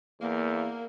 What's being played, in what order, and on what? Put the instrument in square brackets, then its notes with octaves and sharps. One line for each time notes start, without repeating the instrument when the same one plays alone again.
[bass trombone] E2 [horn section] A#3